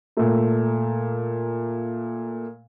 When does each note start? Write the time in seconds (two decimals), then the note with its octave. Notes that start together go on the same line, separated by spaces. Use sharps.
0.17 A#2 A3